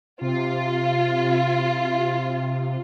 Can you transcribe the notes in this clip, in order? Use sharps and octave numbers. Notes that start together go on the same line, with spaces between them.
C3 F4